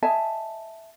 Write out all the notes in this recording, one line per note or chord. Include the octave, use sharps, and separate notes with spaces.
D#5 E5 G#5 A5